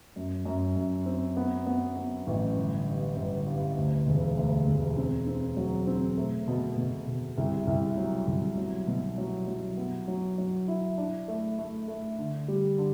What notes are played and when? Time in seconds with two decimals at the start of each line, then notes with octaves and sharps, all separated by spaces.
0.16 F#2
0.45 F#2
0.76 F#2
1.06 C4
1.37 B3
1.66 B3
1.96 B3
2.27 A1
2.57 G1
2.87 G2
3.17 G1
3.46 G2
3.77 D2
4.07 E1
4.37 D2
4.67 E1
4.97 C4
5.27 C4
5.57 F#3
5.87 C4
6.17 A3
6.48 B2
6.77 B2
7.08 B2
7.38 C2
7.67 C2
7.97 F#3
8.28 C2
8.57 F#3
8.87 B2
9.18 F#3
9.47 F#3
9.77 B3
10.08 F#3
10.38 F#3
10.68 E4
10.97 D4
11.28 A3
11.58 A3
11.88 A3
12.18 D3
12.48 G3
12.78 D3